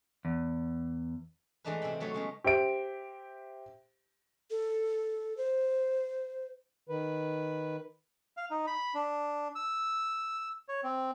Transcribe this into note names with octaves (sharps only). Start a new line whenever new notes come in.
E2
E3 G#3 A3 D4 D#4 B4
C3 E4 C5 G5 B5
F#3 A3 D#4 C#5
C#3 G#3 B3
G4 C5 E5 D7
A4
C5
D#3 B4
F5
D#4
B5
D4
E6
C#5
C4